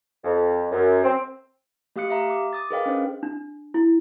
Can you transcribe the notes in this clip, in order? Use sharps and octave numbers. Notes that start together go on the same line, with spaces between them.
F2
F#2
C4
A3 G4 F5 D#6 F#6 C#7
G4 E5 F5 A#5
D6
D6 D#6 A6
G#4 A#4 B4 D#5 F5 G5
C#4 D4 C5
D4
E4